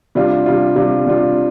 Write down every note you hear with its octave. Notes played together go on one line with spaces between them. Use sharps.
C3 G3 D4 F4
C3 G3 D4 F4
C3 G3 D4 F4
C3 G3 D4 F4